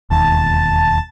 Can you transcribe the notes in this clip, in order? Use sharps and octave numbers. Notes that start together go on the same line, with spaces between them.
E1 D#2 A5